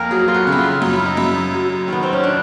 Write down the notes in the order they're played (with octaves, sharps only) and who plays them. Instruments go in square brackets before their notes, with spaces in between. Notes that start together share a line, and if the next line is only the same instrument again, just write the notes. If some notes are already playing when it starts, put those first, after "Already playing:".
Already playing: [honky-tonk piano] F2 A#3 [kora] A#4
[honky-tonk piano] F#3 [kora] G#4
[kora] F4
F#4
[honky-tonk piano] C#3
[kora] E4
F4
[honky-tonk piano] F#2 [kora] F4
[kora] E4
D#4
[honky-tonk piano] F#2 [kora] E4
[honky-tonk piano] F#3
[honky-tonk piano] D#3 [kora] B3
[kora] C4
C#4
D4